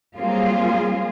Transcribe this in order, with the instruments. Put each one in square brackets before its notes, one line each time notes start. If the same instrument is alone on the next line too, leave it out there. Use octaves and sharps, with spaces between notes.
[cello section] F#3 G3 A#3 C4 F4 G#4